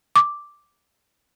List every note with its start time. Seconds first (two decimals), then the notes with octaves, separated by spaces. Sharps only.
0.16 D6